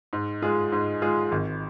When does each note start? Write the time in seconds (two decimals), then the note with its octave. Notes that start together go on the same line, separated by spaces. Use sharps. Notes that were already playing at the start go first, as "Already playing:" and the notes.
0.13 G#2
0.42 G#3 F4 G#4
0.72 G#2
1.02 G#3 F4 G#4
1.32 G#1